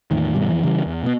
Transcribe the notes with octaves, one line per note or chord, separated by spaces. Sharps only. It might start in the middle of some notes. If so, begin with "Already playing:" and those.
E2 A2 D#3
G2 B2 D#3 G3
F2 E3
C#3 E3 G3
E2
B2 B3